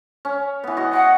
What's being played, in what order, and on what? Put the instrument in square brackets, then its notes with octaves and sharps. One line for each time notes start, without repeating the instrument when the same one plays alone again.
[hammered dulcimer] C#4
E3 B3
F#4 D#5
[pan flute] F#5 [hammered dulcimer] C#6